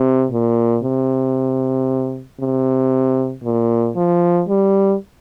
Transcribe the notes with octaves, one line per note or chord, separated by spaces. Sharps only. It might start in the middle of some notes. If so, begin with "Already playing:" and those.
Already playing: C3
A#2
C3
C3
A#2
F3
G3